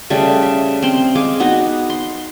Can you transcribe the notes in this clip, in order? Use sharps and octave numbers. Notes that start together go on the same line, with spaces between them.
C#3 G3 A3
E5
C4 C6
G#3 G#4 F5 D6
B3 D#4 F#4
C6